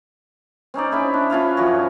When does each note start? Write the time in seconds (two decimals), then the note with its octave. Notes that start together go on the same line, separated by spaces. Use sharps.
0.74 C4 C#4 D#4 D5
0.92 C#4 E4 G#4
1.14 D4
1.30 C#4 E4 F4 F5
1.57 F#2 F3 C#4 F#4